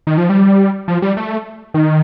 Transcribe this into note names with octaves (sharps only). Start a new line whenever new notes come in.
D#3
F3
G3
F3
G3
A3
D#3